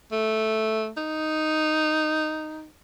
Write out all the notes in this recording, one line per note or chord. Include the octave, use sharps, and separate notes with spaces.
A3
D#4